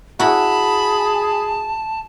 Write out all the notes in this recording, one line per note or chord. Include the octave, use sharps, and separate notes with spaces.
E4 F#4 G#4 A5 B5